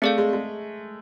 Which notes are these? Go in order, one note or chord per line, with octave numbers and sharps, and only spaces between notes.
A3 C4 G#4 D5 F5
G#3
G#3